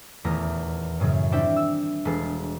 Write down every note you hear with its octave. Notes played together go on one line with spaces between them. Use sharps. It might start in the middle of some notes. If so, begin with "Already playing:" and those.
D#1 E2 A3 A#5
F#2 A2 C#3
G3 C4 D4 E4 E5 G5
E6
E1 G#3 A4 B4 C7